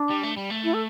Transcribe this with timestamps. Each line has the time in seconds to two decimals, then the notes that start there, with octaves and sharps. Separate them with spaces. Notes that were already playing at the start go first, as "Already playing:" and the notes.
Already playing: D4
0.10 G3
0.23 A3
0.36 G3
0.50 A3
0.64 E4
0.74 A4